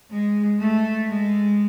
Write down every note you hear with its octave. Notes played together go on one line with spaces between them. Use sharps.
G#3
A3
G#3